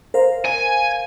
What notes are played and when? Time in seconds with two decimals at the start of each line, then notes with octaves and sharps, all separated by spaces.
0.14 A#4 C5 F5
0.46 G#5